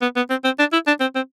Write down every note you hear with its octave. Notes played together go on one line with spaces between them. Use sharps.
B3
B3
C4
C4
D4
E4
D4
C4
C4